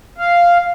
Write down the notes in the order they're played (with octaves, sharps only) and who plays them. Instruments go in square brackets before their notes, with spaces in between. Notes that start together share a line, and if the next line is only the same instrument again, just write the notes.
[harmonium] F5